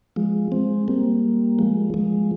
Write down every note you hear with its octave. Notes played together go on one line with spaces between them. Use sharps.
F3 G#3
G#3 C4
G3 A#3
F3 G#3
F3 G#3